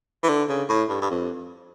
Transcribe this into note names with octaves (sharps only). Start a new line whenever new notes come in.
E3
D3
C#3
A2
G2
G2
F2